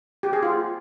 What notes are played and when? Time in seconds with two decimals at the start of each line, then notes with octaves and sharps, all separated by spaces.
0.23 G4
0.33 G#4
0.43 F4